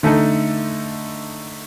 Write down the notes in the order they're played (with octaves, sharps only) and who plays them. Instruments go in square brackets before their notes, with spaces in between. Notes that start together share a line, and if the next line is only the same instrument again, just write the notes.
[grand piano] D3 A3 D#4 A4